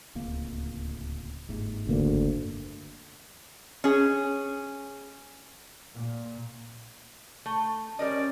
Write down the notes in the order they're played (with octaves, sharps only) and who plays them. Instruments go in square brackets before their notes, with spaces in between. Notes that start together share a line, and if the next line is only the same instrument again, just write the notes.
[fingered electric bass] D1 C#2 A#3
G1 G#2 A3
[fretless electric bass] F#1 C#3 A#3 [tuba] D2
[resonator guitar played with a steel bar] C#4 G#4
[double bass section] A#2
[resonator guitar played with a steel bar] A3
[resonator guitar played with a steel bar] G3 A#4 D#5 [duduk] C#4 [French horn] D5